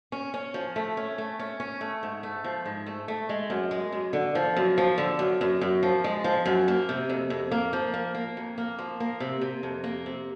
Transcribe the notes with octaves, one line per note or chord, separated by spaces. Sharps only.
C#4
C#4
F3
A3
C#4
A3
C#4
C#4
A3
G#2
A3
F3
G#2
A3
A3
G#3
F#2
G#3
F#2
D3
F3
F#2
F3
D3
F#2
F#2
F#2
F3
G#3
F3
F#2
A#3
C3
F2
F2
A#3
F3
A#3
A#3
F2
A#3
F3
A#3
C3
C3
F2
A#3
C3